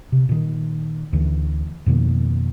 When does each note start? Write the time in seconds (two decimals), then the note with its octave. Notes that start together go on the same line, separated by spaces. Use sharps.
0.12 C3
0.29 A#2 D#3
1.12 D2 D3 E3
1.86 F2 B2 D#3 A#3